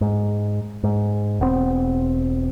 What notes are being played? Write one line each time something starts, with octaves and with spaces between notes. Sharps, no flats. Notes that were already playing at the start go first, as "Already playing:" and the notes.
G#2
G#2
E1 B3 C4